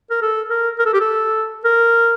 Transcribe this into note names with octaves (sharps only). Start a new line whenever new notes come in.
A#4
A4
A#4
A#4
A4
G4
A4
A#4